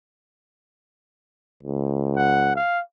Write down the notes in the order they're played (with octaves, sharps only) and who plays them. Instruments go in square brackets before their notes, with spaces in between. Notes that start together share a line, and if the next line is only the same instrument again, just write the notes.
[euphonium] C#2
[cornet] F#5
F5